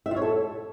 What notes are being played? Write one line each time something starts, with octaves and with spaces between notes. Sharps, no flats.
E5
F4
C#5
A4